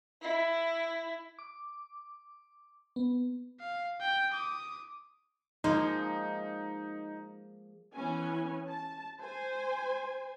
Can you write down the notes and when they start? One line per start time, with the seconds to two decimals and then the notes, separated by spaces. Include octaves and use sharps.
0.22 E4
1.39 D6
2.96 B3
3.60 F5
4.01 G5
4.31 D6 D#6
5.64 F3 G#3 A#3 D#4
7.94 E3 B3 C#4 G#5
8.70 A5
9.20 C5 G#5